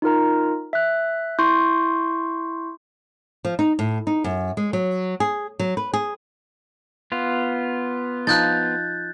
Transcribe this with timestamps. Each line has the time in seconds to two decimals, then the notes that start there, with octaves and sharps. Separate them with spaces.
0.02 D#4 F4 A#4 A#5
0.73 E5 F#6
1.39 E4 C6 C#6 G6
3.45 F3
3.59 D#4
3.79 A2
4.07 D#4
4.24 F#2
4.57 G#3
4.73 F#3
5.20 G#4
5.59 F#3
5.77 B4
5.94 G#4
7.12 B3 F4
8.27 F3 D#4 F#6 G6 A6